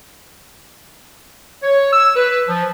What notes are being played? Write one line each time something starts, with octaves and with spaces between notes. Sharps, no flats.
C#5
E6
B4
F3